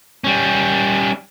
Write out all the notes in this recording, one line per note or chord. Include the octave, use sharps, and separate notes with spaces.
G3 C#4